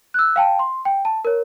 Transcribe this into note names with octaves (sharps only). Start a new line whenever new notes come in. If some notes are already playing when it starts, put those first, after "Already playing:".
E6 F#6
F5 G5 A5
C6
G5
A5
A#4 C#5